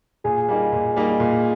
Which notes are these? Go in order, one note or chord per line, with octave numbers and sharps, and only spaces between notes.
A#2 G#4
G3 A#3 D#4
A#2
G3 A#3 D#4
A#2